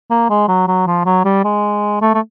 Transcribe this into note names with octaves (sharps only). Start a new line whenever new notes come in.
A#3
G#3
F#3
F#3
F3
F#3
G3
G#3
A3
A3